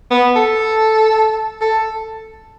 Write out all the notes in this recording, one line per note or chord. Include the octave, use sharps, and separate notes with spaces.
B3
A4
A4